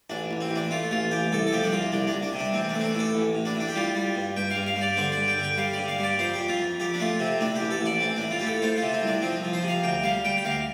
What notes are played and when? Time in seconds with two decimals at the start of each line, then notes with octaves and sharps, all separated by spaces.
0.10 A1 D4
0.31 A1
0.41 C4
0.51 A1 D4
0.71 A3 F4
0.91 A1 F4
1.11 A1 G4
1.32 C2 A4
1.47 A4
1.52 F3 G4
1.64 D4
1.72 C2 F4
1.92 C2 D4
2.07 D4
2.13 C2
2.23 D4
2.33 C3
2.39 D4
2.54 A1 C4
2.69 A3 D4
2.79 C4
2.84 D4
2.95 A2 A4
3.15 A1
3.35 A2
3.45 D4
3.55 A2
3.60 D4
3.68 G4
3.76 G3 F4
3.95 G3
4.15 G2
4.36 G2 G5
4.51 F5
4.56 G2
4.67 F5
4.76 G3
4.81 D5
4.97 D3 C5
5.12 D5
5.17 G2
5.28 G5
5.38 D3
5.43 G5
5.57 G3 F5
5.73 G2 D5
5.88 F5
5.99 G3 D5
6.19 F2 C5
6.34 G4
6.39 F2
6.48 F4
6.60 F2
6.80 F2 G4
6.94 D4
7.00 A3 F4
7.19 C3 C4
7.40 A2 D4
7.55 G4
7.61 A1
7.71 A4
7.81 A1 D5
8.01 A1 C4
8.16 A2 D4
8.31 F4
8.39 A2 G4
8.47 A4
8.62 A3 C5
8.77 F4
8.82 C3
8.93 C4
9.02 C2
9.07 D4
9.22 F3 C4
9.43 F3
9.53 C5
9.63 C3
9.68 F5
9.84 D2 G5
10.03 G3 F5
10.25 G3 G5
10.37 G5
10.45 D2 F5